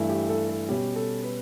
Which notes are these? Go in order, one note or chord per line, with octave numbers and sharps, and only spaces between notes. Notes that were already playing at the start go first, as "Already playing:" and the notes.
Already playing: G2 E3 A3 E4
G4
A4
A4
B2 G3 C#4 G4
A4
B4